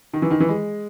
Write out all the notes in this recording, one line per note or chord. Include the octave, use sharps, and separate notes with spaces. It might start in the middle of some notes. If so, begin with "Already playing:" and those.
D#3
E3
D#3
E3
G#3